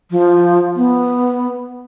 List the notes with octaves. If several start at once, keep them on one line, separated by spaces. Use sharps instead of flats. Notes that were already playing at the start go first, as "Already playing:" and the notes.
F3
B3